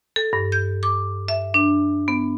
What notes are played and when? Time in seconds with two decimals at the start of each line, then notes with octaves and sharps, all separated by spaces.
0.16 A4
0.33 G2
0.52 G6
0.83 D6
1.28 E5
1.54 D4
2.08 B3